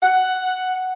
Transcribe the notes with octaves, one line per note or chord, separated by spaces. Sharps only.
F#5